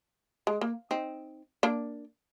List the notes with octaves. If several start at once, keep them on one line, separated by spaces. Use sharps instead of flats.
G#3
A#3
C4 D#4
A#3 D4